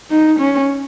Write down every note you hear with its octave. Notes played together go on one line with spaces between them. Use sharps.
D#4
C#4